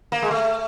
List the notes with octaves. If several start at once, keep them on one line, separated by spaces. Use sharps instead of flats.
A#3
G#3
A3